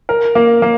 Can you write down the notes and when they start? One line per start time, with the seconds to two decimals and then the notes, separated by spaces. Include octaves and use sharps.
0.09 A#4
0.35 A#3
0.62 A#3